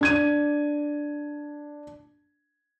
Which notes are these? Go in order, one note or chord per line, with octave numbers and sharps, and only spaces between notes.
D4 G#6 D#7